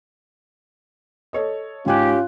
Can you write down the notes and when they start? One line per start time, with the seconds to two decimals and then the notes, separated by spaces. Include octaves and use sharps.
1.33 A4 C#5 D#5
1.86 G#2 C#4 F4 G4 G#5 F#6